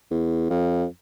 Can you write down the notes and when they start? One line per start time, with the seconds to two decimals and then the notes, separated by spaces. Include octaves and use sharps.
0.11 E2
0.50 F2